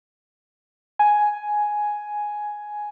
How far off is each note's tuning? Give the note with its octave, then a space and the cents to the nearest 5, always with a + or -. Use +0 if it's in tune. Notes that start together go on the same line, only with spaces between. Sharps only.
G#5 +5